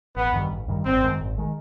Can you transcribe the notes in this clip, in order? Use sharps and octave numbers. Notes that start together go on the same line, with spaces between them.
A1 B3
G2 D#3 G3
A1
G2 D#3 G3
G#1 C4
F#2 D#3 G#3
G#1
D#3 G#3